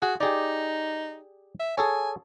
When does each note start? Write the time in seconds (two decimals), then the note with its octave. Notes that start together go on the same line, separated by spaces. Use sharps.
0.02 F#4 G#4
0.21 D#4 G4 G#4 D5
1.60 E5
1.78 G#4 A4 C#5 G#5